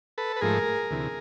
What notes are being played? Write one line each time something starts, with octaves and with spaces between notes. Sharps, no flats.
A4 B4
B4
G#2 F3 A3 G#4 A#4
D2 C3 E3